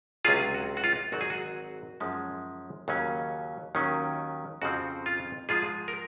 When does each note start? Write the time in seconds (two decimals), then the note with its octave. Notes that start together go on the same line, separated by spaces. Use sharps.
0.25 C#2 C3 F#3 C#4 F4 G#4
0.54 F#4
0.77 F#4
0.84 F4
1.12 G#1 G#2 F#3 C4 D#4 F#4
1.21 G#4
1.30 F#4
2.00 F#2 F3 G#3 C#4
2.88 D#2 C#3 F#3 C#4
3.75 D#2 D#3 F#3 C#4
4.62 F2 C#3 F3 C4 F#4
5.06 F4
5.49 G#2 F3 G#3 F4 G#4
5.88 A#4